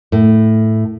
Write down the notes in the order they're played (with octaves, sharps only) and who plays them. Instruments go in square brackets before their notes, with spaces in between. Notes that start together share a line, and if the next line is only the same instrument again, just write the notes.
[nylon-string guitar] A2